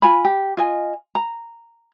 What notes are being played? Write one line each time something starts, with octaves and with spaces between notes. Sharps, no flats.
F4 G#5 B5
G4
F4 D#5 G#5
A#5